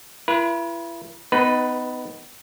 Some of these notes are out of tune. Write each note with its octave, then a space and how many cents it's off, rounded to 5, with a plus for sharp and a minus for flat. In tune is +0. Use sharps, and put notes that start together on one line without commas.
E4 +40 B4 -35
B3 +30 D#4 +0 B4 +0